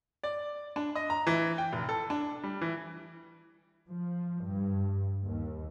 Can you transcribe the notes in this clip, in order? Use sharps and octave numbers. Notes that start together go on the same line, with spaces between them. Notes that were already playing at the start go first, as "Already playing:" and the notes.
D5
D4
D#5
A#5
E3
G5
F1
A4
D4
G3
E3
F3
G2
D#2